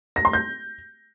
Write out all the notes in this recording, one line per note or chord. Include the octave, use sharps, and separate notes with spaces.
A#6
C6
G6